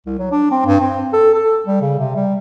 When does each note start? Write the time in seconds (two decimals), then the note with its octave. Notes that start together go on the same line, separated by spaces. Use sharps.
0.06 C2
0.19 F#3
0.32 D4
0.51 C4
0.66 G2
0.81 C4
1.13 A4
1.34 A4
1.67 G3
1.81 C#3
1.99 C3
2.16 G3